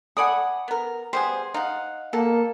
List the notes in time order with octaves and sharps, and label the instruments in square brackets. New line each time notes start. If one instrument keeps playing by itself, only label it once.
[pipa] A4 D5 G#5 [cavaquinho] F#5 B5 D#6
[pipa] B3 A#4
[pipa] G3 B3 G#4 [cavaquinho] C5
[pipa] D#4 [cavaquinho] F5 F#5
[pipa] B2 [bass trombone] A#3 [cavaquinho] A4